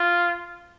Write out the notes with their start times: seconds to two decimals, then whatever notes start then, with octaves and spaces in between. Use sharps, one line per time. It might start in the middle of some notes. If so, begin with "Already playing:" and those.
Already playing: F4